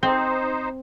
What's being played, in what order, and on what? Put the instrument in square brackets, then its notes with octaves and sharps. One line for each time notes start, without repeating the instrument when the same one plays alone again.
[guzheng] C4 [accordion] D#4 C5